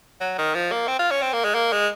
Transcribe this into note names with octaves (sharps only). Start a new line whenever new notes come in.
F#3
D#3
F3
A#3
C4
F4
C#4
C4
A#3
G#3
A#3
G#3